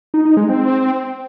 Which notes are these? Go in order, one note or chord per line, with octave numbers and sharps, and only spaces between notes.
D#4
D#4
G#3
C4